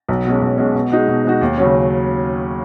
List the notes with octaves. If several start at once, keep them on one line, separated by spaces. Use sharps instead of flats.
B1
B2 G#3 C#4
B1
B2 G#3 C#4
B2
G#3 D#4 F#4
B2
G#3 D#4 F#4
D#2
C#3 F#3 C#4